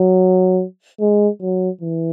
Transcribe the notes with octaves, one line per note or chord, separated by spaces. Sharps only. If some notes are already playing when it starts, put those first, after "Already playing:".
Already playing: F#3
G#3
F#3
E3